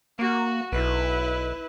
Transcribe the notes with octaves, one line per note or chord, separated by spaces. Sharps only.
A#3 F#4
B1 E4 B4